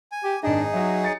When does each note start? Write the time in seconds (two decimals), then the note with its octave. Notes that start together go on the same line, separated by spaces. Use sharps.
0.12 G#5
0.24 G4
0.43 G#1 D4 D#4 G#4 D#5
0.73 F#3 F#4 C#5 E5
1.04 A6 C#7